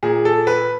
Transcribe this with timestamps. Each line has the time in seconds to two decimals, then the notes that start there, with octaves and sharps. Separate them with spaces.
0.03 A#2 G#4
0.25 A4
0.47 B4